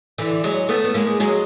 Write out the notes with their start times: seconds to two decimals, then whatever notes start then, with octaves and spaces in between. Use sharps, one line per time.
0.18 D3 E3
0.44 F#3 G#3
0.69 A3 B3
0.84 B3
0.94 G#3 A#3
1.20 F#3 G#3